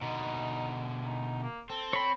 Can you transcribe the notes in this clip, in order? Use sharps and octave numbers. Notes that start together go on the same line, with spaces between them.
B2 D3 D#4
D#4
A#3
C4 A4
C#5 B5